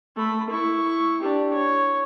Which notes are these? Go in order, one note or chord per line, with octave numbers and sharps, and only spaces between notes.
A3 B5
E4 C#6
D4 G4
C#5